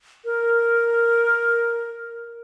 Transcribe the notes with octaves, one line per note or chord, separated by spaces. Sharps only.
A#4